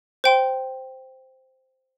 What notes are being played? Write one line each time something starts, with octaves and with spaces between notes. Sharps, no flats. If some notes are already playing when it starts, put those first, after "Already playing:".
C5 G5 C6